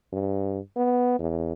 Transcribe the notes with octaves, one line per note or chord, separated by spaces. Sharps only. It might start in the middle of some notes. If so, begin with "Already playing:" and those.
G2
B3
E2